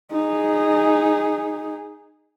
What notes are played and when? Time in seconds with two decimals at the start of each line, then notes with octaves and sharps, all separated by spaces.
0.12 D#4 G#4